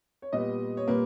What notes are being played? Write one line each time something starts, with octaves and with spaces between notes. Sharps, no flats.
C#5
A#2 G3 B3 D#5
C#5
A#2 G3 A#3 B4